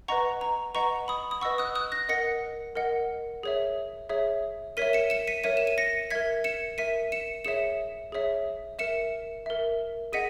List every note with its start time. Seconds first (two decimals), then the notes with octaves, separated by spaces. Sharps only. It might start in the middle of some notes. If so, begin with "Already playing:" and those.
0.08 B4 D#5 F#5 A#5 C#6
0.41 A#5
0.74 B4 D#5 F#5 A#5 C#6
1.08 B5 D#6
1.31 D#6
1.41 B4 D#5 F#5 C#6 E6
1.58 D#6 F#6
1.75 D#6 F#6
1.92 F#6 A#6
2.09 A#4 D#5 F#5 A#6 C#7
2.75 A#4 D#5 F#5
3.43 G#4 C#5 E5
4.09 G#4 C#5 E5
4.77 A#4 C#5 E5 B6 D#7
4.93 C#7 E7
5.10 C#7 E7
5.27 B6 D#7
5.44 A#4 C#5 E5 B6 D#7
5.57 E7
5.67 D#7
5.78 A#6 C#7
6.11 A#4 E5 G#6 B6
6.44 C#7 E7
6.78 A#4 E5 B6 D#7
7.12 C#7 E7
7.45 G#4 C#5 E5 C#7 E7
8.12 G#4 C#5 E5
8.79 A#4 E5 C#7 E7
9.46 A#4 E5
10.13 G#4 D#5 F#5 B6 D#7